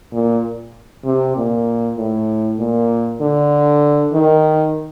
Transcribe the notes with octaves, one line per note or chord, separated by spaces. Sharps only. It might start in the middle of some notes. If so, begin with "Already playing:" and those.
A#2
C3
A#2
A2
A#2
D3
D#3